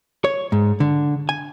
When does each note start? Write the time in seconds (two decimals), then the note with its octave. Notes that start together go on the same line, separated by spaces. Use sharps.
0.24 C#5
0.52 G#2
0.80 D3
1.29 G#5